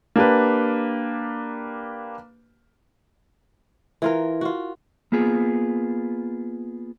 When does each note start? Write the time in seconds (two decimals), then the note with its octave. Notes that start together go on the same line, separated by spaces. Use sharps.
0.16 A#3 D4 G4 B4
4.02 E3 F4 A#4
4.41 F4 F#4
5.12 A#3 B3 F4 G#4